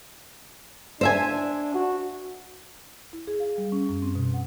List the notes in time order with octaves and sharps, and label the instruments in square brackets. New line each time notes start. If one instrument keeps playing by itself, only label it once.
[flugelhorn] D4 [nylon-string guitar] C5 E5 G#5
[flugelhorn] F#4
[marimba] E4
G#4
F5
G3
C#4
F#2
C4
B2
F#5